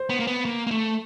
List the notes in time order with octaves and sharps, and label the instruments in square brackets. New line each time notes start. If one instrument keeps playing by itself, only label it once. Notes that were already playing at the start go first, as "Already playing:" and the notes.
Already playing: [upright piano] C5
[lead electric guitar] B3
A#3
B3
A#3
A#3
A3